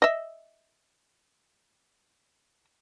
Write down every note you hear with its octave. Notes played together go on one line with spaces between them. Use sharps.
D#5 E5